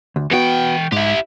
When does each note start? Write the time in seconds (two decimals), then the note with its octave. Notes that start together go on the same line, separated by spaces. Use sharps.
0.16 D2
0.31 E3 B3 F#4 G5
0.92 G#2 E4 G4